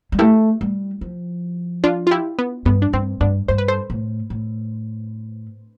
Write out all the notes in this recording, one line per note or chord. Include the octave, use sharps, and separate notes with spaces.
G3
A3 E4 G4
G3
F3
D4 F4
F4
E4 G4
B3
G2 B3
D4
G2 C4
G2 B3 D4
G2 C5
B4
A4 C5
A2
A2